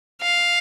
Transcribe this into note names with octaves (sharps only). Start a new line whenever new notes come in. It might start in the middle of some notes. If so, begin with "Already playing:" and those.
F5